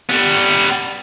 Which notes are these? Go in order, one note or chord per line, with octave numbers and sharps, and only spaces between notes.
G3 B3